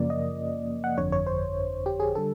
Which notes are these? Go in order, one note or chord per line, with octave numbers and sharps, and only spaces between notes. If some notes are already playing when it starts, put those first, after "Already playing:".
Already playing: F#2 C#3 F3 A#3 D5
D#5
F#5
G1 F2 D3 C#5
C#5
C5
G4
G#4
D3 G3 A4